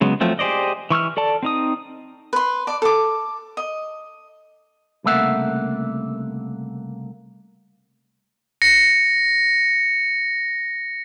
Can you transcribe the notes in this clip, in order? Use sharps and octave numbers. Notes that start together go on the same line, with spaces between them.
C#3 F#3 G#3 B3
F3 F#3 A3 C4 F4
G4 G#4 C5 D5 D#5
E3 C#6 E6 F6
A4 D5 A5
C4 D#4 D#6
B4 C6
D5 A5 D6
A4 D6
D#5
C2 C#3 A3 A#3 E5 F#5
A#6 C#7